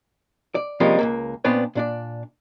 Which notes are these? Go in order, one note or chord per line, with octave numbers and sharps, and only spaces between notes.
D5
C3 F3 G3 G#3 A#3 C#4
C#2 G2 A#3
A#2 B3 C4 D4 B4 C#5
A#2 D4 D5